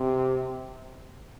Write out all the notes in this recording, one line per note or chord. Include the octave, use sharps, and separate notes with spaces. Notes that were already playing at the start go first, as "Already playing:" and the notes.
Already playing: C3